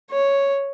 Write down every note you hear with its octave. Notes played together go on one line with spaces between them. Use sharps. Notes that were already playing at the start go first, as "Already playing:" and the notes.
C#5